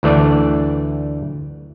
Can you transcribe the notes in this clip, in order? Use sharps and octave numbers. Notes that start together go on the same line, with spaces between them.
D2 E3 A3 D4 D5